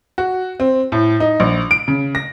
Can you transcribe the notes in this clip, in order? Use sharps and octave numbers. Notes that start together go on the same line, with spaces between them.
F#4
C4
A2
D#4
A#1
D7
C#3
A#6